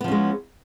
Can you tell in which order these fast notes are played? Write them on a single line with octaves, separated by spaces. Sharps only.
B3 F3 C#4 G#3